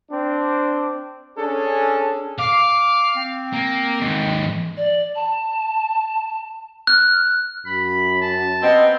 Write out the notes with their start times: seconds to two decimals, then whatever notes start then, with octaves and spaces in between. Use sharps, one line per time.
0.10 C4 D4
1.37 C#4 D4 G#4 A4
2.39 F5 D6
3.17 C4
3.53 A#3
4.01 D#2 G#2
4.77 D5
5.15 A5
6.87 F6 F#6
7.66 F#2 B5
8.21 A5
8.63 C3 B3 C4 D#5